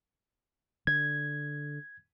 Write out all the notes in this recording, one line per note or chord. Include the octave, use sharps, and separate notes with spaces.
D3 G#6